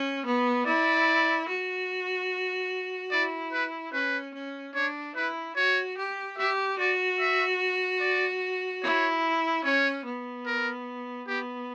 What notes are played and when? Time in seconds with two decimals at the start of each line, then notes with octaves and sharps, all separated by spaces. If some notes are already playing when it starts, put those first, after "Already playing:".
Already playing: C#4
0.26 B3
0.66 E4 D5
1.48 F#4
3.11 E4 D5
3.53 B4
3.93 C#4 B4
4.34 C#4
4.75 D4 C#5
5.16 E4 B4
5.56 F#4 C#5
5.97 G4
6.38 G4 E5
6.79 F#4 D5
7.20 E5
8.01 D5
8.83 E4 C#5
9.64 C#4 C#5
10.05 B3
10.46 A#4
11.27 B3 G4